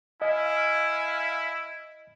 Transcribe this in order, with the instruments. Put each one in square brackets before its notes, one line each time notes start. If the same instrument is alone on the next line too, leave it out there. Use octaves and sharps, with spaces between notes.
[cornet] E4 [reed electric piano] D#5 [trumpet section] F5 G#5